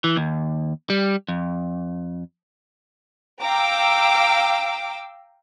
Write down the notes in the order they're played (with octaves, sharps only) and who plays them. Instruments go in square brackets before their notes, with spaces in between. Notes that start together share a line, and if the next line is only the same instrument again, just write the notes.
[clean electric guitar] E3
D#2
G3
F2
[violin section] F5 G5 A#5 D6 E6